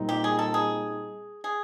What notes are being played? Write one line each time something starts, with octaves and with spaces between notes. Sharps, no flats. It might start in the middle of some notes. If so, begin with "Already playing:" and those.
Already playing: A#2 G3 C4 D#4
G4
G#4
A4
G#4
G#4